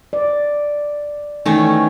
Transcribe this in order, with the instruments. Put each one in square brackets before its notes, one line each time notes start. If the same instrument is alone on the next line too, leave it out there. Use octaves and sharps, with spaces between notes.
[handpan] D5
[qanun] D#3 A3 C#4 [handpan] E3